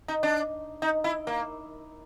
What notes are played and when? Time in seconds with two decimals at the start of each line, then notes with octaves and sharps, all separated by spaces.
0.08 D#4
0.23 D4
0.82 D#4
1.04 E4
1.27 A#3